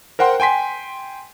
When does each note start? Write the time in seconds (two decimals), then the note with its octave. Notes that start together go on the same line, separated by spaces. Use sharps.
0.19 A#4 C5 F#5 G5 C6
0.40 G5 G#5 C6 B6